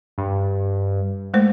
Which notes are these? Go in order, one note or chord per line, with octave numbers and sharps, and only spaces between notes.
G2
G#3 A3 C5